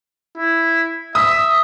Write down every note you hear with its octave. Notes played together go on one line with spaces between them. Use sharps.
E4
E5 D#6